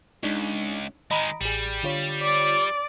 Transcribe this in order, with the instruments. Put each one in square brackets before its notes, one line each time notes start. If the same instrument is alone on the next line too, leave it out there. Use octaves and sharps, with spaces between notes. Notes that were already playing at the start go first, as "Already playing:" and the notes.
[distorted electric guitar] C#2 [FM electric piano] G#3 D4 D#4
[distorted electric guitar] D#3 G#3 [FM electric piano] D#5 A#5 B5
[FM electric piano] A1 G#4 [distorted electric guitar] G3
[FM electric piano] D3 F4 C#5
[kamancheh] D5